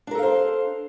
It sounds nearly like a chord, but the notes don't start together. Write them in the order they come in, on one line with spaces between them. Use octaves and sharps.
D4 A#4 A4 F5 C5